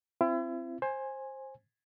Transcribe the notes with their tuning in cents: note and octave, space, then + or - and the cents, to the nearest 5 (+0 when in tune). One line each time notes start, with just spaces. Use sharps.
C4 +0 E4 +40
C5 +20 G#5 -5